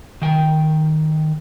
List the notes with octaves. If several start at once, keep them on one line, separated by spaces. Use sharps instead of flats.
D#3 G5